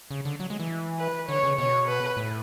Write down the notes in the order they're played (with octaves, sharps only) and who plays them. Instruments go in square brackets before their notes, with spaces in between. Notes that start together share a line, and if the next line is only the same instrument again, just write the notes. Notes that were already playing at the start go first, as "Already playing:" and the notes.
[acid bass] C#3
D3
F#3
G#3
E3
[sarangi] B4
[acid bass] D3 [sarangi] C#5
[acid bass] C#3
[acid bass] B2 [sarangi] C#5
[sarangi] B4
[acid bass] A2